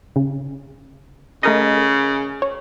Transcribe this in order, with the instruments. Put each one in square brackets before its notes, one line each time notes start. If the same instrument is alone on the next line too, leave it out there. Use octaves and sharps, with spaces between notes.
[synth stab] C#3
[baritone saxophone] C#3 [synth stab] A3 A#4 D#5
[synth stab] C#5